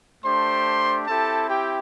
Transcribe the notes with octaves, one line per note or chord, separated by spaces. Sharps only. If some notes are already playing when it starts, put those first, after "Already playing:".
A3 D4 G4 C5 C6
C4 E4 G4 A4 A5
G4 G5